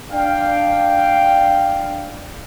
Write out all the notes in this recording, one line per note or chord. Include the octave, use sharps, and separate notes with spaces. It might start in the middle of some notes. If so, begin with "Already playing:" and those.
D4 F5 G5